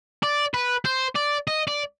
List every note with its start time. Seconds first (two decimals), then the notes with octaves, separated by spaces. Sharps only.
0.23 D5
0.54 B4
0.85 C5
1.16 D5
1.48 D#5
1.67 D5